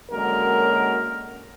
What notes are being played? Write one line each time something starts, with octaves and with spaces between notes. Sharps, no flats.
F#2 D3 F#3 G#3 A#3 A#4